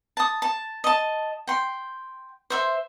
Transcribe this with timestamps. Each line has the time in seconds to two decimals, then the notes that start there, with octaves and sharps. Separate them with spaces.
0.17 A5 D#6
0.42 A5
0.84 D#5 A5
1.47 G5 C6
2.50 C5 E5 C6